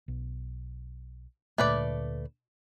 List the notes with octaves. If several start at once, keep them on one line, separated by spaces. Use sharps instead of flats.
B1
D2 A#2 A3 A#3 B4 D5